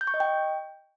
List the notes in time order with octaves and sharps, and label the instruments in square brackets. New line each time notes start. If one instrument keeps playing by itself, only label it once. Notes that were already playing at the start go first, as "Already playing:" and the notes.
[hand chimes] G6
C#6
D#5
G5